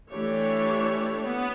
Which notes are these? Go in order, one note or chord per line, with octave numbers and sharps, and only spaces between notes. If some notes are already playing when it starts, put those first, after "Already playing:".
E3 A3 D4 G4 C#5
B3